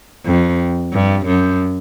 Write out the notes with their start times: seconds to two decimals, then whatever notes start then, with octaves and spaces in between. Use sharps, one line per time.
0.26 F2
0.93 G2
1.27 F#2